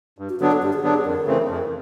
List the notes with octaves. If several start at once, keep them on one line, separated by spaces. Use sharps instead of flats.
G2
F#4
D3 F#3 B3 D4 F#4
A4
G2 G4
G#4
D3 F#3 B3 D4
G#4
F2 A#4
C#3 E3 A3 C4
F2